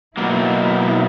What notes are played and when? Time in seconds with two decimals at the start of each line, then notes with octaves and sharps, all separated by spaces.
0.17 B2 F#3 A#3 E4